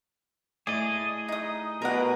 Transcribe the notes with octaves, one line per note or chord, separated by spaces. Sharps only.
A2 G#4 D5 D#5
D#4 D#6
B2 A#4 D5 F#5